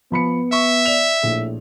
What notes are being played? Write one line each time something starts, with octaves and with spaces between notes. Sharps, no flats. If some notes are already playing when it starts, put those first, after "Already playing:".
F3 B3 B5 C#7
E5 C#6
D5 F7
A#1 A2